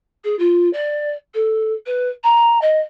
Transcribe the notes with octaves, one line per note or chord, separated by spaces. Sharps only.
G#4
F4
D5
A4
B4
A#5
D#5